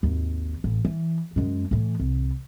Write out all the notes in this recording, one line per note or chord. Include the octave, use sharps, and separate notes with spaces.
G#1 D#2
A1
E3
F#2 G#3
A2 E3
C2